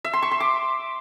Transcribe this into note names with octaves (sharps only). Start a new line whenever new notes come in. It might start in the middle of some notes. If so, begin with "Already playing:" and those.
E5
C6
C#6
C6
D6